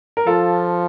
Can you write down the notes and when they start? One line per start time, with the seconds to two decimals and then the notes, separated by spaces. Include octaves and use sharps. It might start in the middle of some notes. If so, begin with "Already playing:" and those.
0.17 A#4
0.27 F3 F4 A4